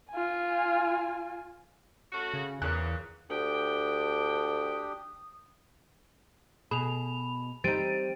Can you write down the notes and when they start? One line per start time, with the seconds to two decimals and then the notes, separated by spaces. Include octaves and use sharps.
0.11 F4 G#5
2.12 A3 C#4 F#4
2.34 C#3
2.62 E2 A#2 C#3 F#6
3.30 D2 D4 G4 G5 D#6
6.71 B2 G#4 B5 F7
7.64 G3 C4 D#4 A6 D7 D#7